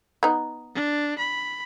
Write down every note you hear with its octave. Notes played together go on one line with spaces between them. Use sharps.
B3 D#4
D4
B5